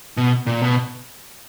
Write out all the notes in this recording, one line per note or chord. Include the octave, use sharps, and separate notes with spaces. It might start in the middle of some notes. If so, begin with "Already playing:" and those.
B2
A#2
B2